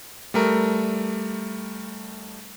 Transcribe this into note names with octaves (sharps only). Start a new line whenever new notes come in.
G3 A3 A#4